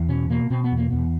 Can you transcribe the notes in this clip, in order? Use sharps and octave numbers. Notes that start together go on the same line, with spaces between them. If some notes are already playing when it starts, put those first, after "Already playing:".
Already playing: E2
B2 C#4
B2 A#3
B2 C4
B3
E2
A#3
E2 B3